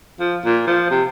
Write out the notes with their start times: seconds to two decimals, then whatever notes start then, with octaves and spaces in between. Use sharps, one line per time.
0.20 F3
0.45 A#2
0.67 F3
0.91 C3